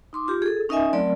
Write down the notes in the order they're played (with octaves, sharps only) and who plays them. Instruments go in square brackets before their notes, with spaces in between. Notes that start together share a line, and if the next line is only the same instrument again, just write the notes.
[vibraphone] D#4 C6 D6
F4 G4
G#4 A4
C#4 D#4 A#4 D#5 E5 G#5
F#3 A3 C4 A#4 D5